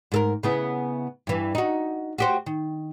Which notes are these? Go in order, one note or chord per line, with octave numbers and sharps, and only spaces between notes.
G#2 A4 A#4
C#3 B3 E4
G2 E3
D#4 F#4
F#4 G4 C5
D#3